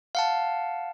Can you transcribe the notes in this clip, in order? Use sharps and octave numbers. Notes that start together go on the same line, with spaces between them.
F5 F#5 A5